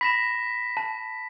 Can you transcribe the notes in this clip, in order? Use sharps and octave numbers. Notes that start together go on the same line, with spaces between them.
B5 A#6 B6 E7
A5